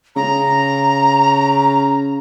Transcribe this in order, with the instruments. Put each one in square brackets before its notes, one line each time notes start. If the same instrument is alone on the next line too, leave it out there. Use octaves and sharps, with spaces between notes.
[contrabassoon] C#3 [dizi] A#5